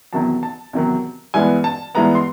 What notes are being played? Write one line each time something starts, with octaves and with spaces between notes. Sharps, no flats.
E2 C3 D#3 F#3 A5
A5
E2 C3 D#3 F#3
G2 E3 G#3 B3 G#5
A5
G2 E3 G#3 B3 A#5
C6